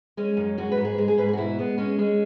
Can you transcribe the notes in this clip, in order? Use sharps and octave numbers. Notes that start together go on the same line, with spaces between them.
G#3 C#4
F#2
G#3 F#4
B4
G#2
G#4
G#3 G#4
G#4
G#2 B4
G#4
F#4
B2 E4
G#3 B3
G#3 C#4
G#3 C#4